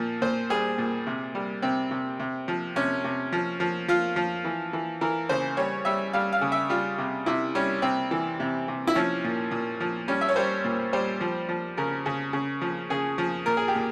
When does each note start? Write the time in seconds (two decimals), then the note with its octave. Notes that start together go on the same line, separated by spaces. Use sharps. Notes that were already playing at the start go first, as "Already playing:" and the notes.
Already playing: A#2 F3
0.22 A#2 C5
0.50 G3 G#4
0.78 A#2
1.06 C3
1.35 G3
1.62 C3 C4
1.91 C3
2.19 C3
2.48 F3
2.76 C3 C#4
3.04 C3
3.32 F3
3.60 F3
3.88 F3 F4
4.16 F3
4.45 E3
4.73 E3
5.01 E3 A#4
5.29 C#3 C5
5.57 G3 C#5
5.85 G3 E5
6.13 G3 F5
6.32 F5
6.41 C#3
6.52 E5
6.69 G3 F4
6.98 C3
7.26 C3 E4
7.55 G3 C#4
7.82 C3 C4
8.11 E3
8.40 C3
8.68 C3
8.87 E4
8.95 F3 C#4
9.24 A#2
9.51 A#2
9.80 F3
10.08 G3 C#4
10.21 E5
10.29 C#5
10.36 G3 C5
10.64 A#2
10.93 G3 C5
11.20 F3
11.49 F3
11.77 C#3 A#4
12.06 C#3
12.33 C#3
12.61 F3
12.90 C#3 G#4
13.18 F3
13.46 A#2 A#4
13.57 G#4
13.68 G4
13.75 A#2